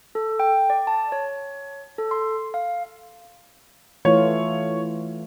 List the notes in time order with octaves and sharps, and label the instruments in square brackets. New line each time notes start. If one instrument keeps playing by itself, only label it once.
[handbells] A4
G5
D5
A5
C#5
A4
C6
F5
[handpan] E3 A3 F4 [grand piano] C#5